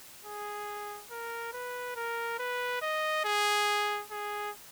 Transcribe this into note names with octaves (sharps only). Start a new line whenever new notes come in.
G#4
A#4
B4
A#4
B4
D#5
G#4
G#4